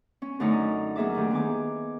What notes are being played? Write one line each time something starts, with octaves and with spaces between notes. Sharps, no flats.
C#4
F#2 D3 A3 C#4 D#4
F#3 A#3 G#4 E5 D6
D2 D#3 G4
D#3 B3 G#5 D6